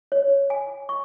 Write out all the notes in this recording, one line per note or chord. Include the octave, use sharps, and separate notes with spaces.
C#5
G#5
C#6